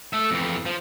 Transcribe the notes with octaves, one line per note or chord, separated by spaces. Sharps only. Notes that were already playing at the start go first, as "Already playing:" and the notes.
A3 E5
F2 E3
F3